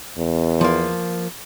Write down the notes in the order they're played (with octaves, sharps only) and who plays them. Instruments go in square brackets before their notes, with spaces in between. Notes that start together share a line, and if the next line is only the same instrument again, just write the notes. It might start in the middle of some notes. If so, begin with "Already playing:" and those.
[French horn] E2
[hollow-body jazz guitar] F3 A#3